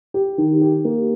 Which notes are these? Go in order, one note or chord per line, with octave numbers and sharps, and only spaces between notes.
G4
D#3
G4
A#3